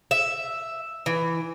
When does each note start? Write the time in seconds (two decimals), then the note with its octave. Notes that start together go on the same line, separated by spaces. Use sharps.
0.11 E5
1.06 E3